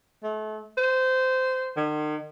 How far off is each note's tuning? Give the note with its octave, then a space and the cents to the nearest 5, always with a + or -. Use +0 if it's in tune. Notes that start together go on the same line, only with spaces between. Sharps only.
A3 -35
C5 -20
D#3 -45